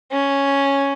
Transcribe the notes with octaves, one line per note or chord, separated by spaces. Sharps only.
C#4